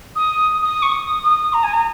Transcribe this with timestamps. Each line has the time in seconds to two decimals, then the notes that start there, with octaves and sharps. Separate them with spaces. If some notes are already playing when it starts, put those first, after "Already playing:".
0.15 D#6
0.61 D#6
0.82 C#6
0.91 D#6
1.22 D#6
1.53 A#5
1.63 G#5
1.73 A#5